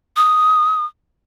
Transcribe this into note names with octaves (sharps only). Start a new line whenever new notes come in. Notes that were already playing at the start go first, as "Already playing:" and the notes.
D#6